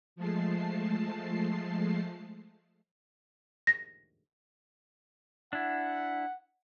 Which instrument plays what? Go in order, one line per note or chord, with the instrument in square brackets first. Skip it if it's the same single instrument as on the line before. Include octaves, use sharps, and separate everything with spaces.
[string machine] F3 G#3 A3 A5 C7
[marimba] A#6
[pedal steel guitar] D4 E4 [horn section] F#5